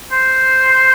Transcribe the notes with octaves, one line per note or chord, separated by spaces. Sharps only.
C5